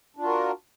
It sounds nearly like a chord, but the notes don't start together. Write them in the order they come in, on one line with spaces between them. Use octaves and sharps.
D4 F4 F#4 A#4